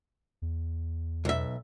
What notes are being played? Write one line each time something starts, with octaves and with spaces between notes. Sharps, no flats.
E2
B1 E5